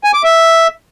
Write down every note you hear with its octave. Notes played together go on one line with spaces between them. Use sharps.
G#5
D6
E5